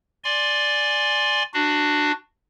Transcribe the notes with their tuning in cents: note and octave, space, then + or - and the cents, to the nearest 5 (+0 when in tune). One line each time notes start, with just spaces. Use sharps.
D5 +0 G#5 +0 C6 +10
D4 +15 F#4 +0